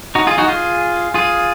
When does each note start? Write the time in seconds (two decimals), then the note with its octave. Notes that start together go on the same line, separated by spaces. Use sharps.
0.15 D#4 F#4
0.27 F4 G#4
0.38 D#4 F#4
0.48 F4 G#4
1.14 F4 G#4